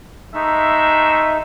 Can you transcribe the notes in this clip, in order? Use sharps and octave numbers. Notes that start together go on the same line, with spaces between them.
G#3 A3 D#4 E5